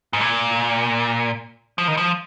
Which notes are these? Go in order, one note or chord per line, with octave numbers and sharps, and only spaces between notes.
G#2
A#2
F3
D#3
F3